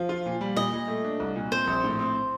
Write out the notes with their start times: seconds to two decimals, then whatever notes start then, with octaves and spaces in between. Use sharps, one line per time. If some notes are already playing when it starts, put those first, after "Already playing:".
Already playing: F3 F5
0.09 F4
0.26 A#2
0.41 G3
0.56 A#2 D#5
0.73 A#2
0.88 A3
1.04 D4
1.20 C2
1.35 A#2
1.52 C4 C5
1.67 A#1
1.84 A2
1.99 C4